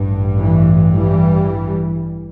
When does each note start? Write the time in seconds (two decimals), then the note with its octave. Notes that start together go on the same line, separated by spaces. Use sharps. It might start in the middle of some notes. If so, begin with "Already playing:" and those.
Already playing: A1 G2
0.40 E3
0.95 E3 G3